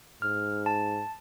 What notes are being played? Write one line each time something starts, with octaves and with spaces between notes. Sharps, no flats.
G#2 F6
A5